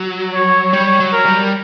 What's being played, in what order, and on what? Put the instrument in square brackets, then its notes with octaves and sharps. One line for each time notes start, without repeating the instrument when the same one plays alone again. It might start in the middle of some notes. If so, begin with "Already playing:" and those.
Already playing: [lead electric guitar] F#3
[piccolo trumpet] C#5
[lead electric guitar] G3 [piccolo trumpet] C#5
[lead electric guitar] F#3
[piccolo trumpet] A#4
[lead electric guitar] G3